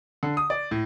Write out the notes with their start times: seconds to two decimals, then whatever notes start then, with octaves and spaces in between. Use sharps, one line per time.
0.23 D3
0.37 D#6
0.50 D5
0.71 A2